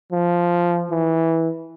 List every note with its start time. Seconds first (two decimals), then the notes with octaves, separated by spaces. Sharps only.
0.12 F3
0.91 E3